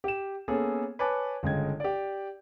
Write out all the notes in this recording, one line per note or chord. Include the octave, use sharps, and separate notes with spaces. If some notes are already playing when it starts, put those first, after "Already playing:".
G4 E7
A#3 B3 C#4 G#4 A4
B4 C#5 G#5 A5 D6
G1 C#3 G#3 D#5 G5 G#6
G4 D5